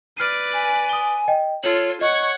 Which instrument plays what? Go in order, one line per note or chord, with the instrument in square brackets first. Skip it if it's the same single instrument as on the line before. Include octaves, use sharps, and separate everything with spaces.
[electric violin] B4 D5 [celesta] F6 C7 D#7
[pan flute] G#5
[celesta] D#6 G7
D#5 G5
[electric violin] F4 A4 [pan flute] C#5 [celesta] F#7
[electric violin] C#5 F#5 [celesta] D#5 [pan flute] C#6